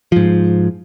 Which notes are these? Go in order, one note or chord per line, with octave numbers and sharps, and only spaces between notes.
G#2 F3